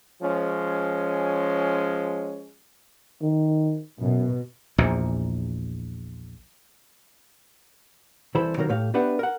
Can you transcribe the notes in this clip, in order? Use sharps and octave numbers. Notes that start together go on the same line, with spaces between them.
F3 G#3 C#4
D#3
F#2 B2
A#1 E2 A#2
C2 E3 E4 A4 C5 B5
C3 D#3 F#3 A#3 A#4
A2 A3 G4 F5
B3 D4 G4 B4 E5 F#5
A#4 F#5